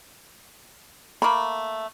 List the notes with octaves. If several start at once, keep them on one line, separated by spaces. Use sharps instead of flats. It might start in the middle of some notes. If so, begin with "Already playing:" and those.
A3 A#3 B5